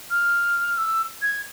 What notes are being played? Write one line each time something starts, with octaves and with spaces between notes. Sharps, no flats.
F6
E6
G#6